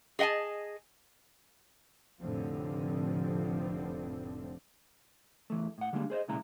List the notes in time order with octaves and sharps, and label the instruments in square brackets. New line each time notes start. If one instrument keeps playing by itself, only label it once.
[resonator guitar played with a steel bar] G#4 D#5 F#5 G#5 A5
[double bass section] F1 A2 D3 F3 C4
[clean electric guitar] E2 E3 A3
A2 F#5
D3 G3 G#3 A#3 D4
G#4 C5 C#5 D#5
B1 A#2 C#3 G#3 E4 A#5